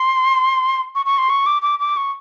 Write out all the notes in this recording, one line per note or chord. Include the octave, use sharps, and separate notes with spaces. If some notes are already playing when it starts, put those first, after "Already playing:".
Already playing: C6
C#6
C#6
C6
C#6
D6
D6
D6
C#6